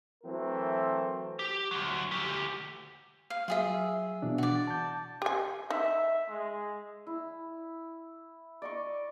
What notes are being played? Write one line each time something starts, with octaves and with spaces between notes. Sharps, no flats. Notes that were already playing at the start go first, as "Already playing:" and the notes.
E3 F#3 A3 C4 A#4
G4
D2 F#3
D2 G4
F5
F#3 F4 G#4 E5
B2 E3 D4
F#4 D5
A5 G6
G4 G#5
D#4 E5
G#3
E4
D5 D#5 C#6